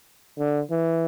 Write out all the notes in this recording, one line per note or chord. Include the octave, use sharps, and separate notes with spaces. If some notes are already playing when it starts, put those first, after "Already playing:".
D3
E3